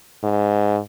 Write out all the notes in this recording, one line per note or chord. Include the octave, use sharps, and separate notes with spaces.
G#2